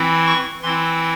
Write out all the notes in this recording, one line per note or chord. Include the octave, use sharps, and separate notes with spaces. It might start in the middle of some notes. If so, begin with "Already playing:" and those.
Already playing: E3 C4 E4
C#6
E3 C4 E4 C6